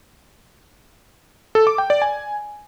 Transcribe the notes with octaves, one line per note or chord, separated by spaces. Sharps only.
A4
D6
G5
D5
G#5